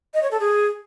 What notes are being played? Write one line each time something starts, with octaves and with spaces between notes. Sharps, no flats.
D#5
C#5
A4
G#4